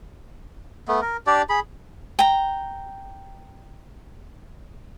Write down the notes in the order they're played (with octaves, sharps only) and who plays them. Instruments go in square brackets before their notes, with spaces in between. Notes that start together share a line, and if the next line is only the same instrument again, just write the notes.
[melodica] A3 B3
A#4
D4 G4 D5
G#4 B5
[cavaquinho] G5 A#5